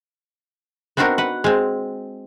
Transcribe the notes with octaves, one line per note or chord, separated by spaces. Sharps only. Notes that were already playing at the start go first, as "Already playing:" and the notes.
B3 C4 D4 D#4 F#4 A#4
B4 F#5
G#3 C4